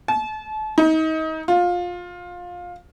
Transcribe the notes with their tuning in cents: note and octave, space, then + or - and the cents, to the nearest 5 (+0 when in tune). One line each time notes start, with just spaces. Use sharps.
A5 -35
D#4 +30
F4 +20